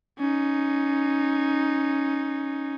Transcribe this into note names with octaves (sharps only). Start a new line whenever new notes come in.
C#4 D#4